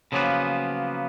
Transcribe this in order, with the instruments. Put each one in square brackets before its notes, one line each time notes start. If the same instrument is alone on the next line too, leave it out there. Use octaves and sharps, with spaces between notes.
[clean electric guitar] C#3 F3 F#3 A#3 B3